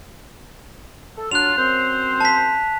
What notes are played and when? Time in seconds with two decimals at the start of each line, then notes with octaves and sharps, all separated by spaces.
1.17 A4
1.31 F#3 D4 F4 F#6 F7
1.57 F#2 C4 C5
2.21 A5 B6